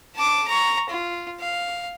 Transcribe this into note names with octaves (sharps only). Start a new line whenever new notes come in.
A5 D6
A#5 C#6
F4
F5